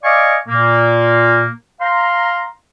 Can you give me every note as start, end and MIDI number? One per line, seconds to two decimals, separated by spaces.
0.04 0.38 74
0.04 0.38 75
0.04 0.38 77
0.04 0.38 80
0.04 0.38 85
0.04 0.38 86
0.49 1.51 46
0.49 1.51 58
1.81 2.47 77
1.81 2.47 82
1.81 2.47 84